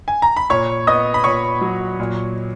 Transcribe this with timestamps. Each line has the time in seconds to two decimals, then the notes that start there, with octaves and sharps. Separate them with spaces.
0.08 G#5
0.22 A#5
0.37 B5
0.50 A#2 C#5 C#6
0.87 B3 D#5 D#6
1.14 B5
1.24 A#2 C#5 C#6
1.61 F#3
2.00 A#2